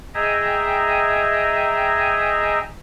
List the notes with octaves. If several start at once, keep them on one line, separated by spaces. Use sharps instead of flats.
G#4 D#5 E5 G5 G#5 A#5